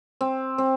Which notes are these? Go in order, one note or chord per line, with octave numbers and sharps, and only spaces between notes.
C4
C4